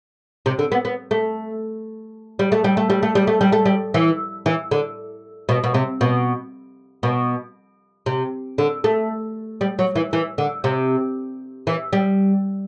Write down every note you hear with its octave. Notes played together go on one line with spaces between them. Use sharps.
C3
D3
B3
B3
A3
G3
A3
G3
A3
G3
A3
G3
A3
G3
A3
G3
E3
E3
D3
B2
B2
C3
B2
B2
C3
D3
A3
G3
F#3
E3
E3
D3
C3
E3
G3